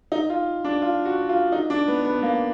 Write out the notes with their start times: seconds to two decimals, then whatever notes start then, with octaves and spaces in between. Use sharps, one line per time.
0.12 D#4
0.30 F4
0.64 D4
0.82 F4
1.05 F#4
1.29 F4
1.52 D#4
1.70 D4
1.88 B3
2.05 B3
2.22 A#3